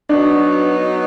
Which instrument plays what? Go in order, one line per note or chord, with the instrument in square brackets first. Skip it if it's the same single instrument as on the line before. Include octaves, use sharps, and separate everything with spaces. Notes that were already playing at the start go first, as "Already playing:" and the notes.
[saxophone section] B2 F#3 B3 D#4 [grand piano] D4